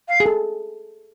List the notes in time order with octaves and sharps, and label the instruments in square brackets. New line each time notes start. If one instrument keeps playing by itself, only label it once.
[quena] F5
[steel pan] G#4
A4